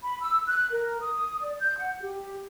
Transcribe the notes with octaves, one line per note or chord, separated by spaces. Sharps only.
B5
E6
F#6
A#4
D#6
D5
G6
F#5
G4